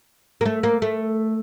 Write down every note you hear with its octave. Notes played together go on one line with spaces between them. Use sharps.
A#3
A3
A#3
A3